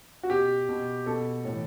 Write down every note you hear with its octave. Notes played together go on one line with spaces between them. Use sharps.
F#4
B2 G4
B2
B2 A4
A2 E3